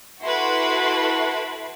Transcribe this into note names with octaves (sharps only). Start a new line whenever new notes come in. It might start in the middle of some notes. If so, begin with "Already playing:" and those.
E4 F#4 A4 B4 C6